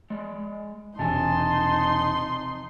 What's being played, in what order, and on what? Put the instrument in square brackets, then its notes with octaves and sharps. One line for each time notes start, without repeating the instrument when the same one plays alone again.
[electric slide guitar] G#3 D5
[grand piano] E1 [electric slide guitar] C3 F3 G#5 [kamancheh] D#4 C6 [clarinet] A5